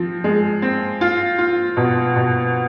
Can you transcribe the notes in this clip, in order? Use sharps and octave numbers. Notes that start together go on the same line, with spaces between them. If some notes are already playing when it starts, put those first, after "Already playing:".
Already playing: F3 C4
G#3
C4
F4
F4
B2
B2